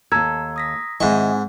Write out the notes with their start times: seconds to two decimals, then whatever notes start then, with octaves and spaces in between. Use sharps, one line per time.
0.12 D#2 A4 A#5 E6 G#6
0.56 D#6 A#6 B6
1.00 G#2 D#3 C4 E4 D#5 F#5 G#5 C#6